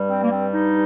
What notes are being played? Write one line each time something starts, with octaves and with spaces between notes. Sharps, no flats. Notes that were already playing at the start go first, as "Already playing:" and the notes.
Already playing: G2 G3
C4
A#3
C4
D#4